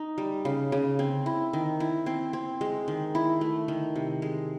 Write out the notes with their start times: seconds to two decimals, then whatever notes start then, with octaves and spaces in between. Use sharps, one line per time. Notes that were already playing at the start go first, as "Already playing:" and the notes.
Already playing: D#4
0.18 G3
0.45 C#3
0.72 C#3
0.99 C4
1.26 E4
1.53 D#3
1.80 E4
2.06 C4
2.33 C4
2.61 G#3
2.88 D#3
3.15 E4
3.41 A3
3.68 D#3
3.96 C3
4.22 G#3